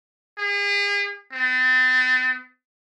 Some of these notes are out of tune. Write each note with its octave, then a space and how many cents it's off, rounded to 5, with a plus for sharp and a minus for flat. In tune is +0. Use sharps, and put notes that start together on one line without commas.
G#4 -45
C4 -45